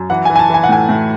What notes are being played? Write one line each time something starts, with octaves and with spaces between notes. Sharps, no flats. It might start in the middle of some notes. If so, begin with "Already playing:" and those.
Already playing: F#2
E3 F#5
G#5
E3
G#5
A5
E3 G#5
F#5
A2 G#5
A2